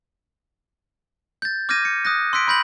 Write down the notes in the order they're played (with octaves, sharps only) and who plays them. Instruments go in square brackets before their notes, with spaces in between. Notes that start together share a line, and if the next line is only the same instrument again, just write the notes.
[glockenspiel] G6 A6
D6 F6 G6 G#6 A#6 D#7
C#7
D#6 F#6 A#6
C6 E6 F#6 B6 D7
B5 C6 G6 A#6 F#7